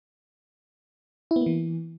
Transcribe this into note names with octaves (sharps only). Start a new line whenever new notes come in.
E4
B3
A#3
E3